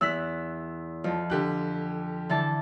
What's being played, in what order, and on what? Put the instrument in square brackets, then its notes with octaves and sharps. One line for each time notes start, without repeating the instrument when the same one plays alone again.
[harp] E2 F#6 [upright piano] E6 B6
[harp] F2 [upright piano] F3
[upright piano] D3 G4 F#6
[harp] D3 E3 A5